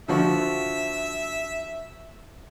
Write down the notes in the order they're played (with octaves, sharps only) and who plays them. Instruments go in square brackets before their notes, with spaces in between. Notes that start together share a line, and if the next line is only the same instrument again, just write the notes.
[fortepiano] D3 F3 F#4 [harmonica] E5